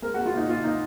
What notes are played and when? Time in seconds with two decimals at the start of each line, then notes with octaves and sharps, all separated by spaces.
0.02 G#3 A#4
0.14 F#4
0.18 G#3
0.26 F4
0.33 A#2 D#4
0.49 A#2 F4
0.64 A#2 D#4